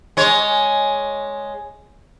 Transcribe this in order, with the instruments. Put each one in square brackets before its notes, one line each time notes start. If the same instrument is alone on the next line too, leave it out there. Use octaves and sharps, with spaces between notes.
[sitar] G#3 C#5